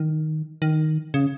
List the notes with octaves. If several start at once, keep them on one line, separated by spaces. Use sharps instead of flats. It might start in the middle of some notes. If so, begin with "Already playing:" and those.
Already playing: D#3
D#3
C#3